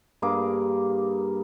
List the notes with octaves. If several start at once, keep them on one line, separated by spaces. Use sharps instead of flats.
G2 A#3 G#4 D6